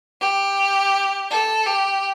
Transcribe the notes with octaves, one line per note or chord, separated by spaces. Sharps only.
G4
A4
G4